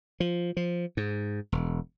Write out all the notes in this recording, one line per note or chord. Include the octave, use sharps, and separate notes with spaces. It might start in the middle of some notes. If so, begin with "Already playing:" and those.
F3
F3
G#2
E1